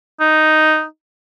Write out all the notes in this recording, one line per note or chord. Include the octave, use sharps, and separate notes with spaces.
D#4